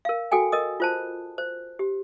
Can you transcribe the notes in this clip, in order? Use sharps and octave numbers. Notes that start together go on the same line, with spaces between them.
A#4 F5
F#4 A4 G5 G#5
A#4 D#5 D#6
F4 C5 A5
C5
G4